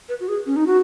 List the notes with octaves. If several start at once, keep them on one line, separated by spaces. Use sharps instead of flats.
B4
F#4
G#4
C#4
D#4
F#4